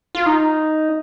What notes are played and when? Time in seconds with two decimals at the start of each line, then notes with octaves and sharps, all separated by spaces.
0.15 F4
0.26 D#4